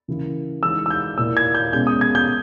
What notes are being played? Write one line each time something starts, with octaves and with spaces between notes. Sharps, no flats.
C#3 E3 A#3 E4
E3 G#3 D#4 E6
E6
G6
A#2 A#3 E4 E6
G#6
G6
B2 G#3 C#4 G6
D#6
G#6
G6